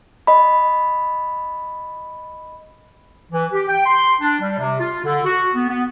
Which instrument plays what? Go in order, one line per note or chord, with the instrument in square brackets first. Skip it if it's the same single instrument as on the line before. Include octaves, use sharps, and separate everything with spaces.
[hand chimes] D#5 B5
[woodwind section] E3
G4
G5
C6
D4
G3
C3
F4
D3
F#4
B3
B3